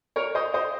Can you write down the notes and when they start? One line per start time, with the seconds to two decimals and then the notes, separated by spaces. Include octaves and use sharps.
0.16 A#4 C#5
0.35 C5 D#5
0.54 C5 D#5